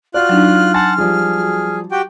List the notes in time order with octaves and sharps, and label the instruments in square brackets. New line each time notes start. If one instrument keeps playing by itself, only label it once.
[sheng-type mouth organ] F4 F#6 [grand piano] F#4 D5 [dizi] F6
[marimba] F#3 D4 D#4
[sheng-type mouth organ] F#5 A5 [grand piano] G#5 C6 A6
[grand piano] F3 G3 [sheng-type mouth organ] G#4
[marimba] F#4
[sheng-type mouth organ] F#4 G4 G5